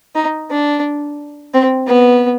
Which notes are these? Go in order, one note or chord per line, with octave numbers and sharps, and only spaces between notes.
D#4
D4
C4
B3